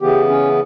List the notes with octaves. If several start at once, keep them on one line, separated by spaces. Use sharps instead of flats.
C#3 E3 B3 G4
C#4